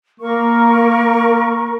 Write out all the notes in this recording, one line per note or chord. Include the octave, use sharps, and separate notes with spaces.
A#3 A#4 C#6